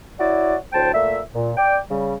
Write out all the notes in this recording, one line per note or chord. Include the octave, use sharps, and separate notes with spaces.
E4 F#4 C#5 D5
D2 A2 C5 G5 A5
A#2 A3 E5
A#2
D5 G5
C#3 G3